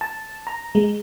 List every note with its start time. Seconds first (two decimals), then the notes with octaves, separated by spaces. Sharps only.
0.01 A5
0.47 A#5
0.75 G#3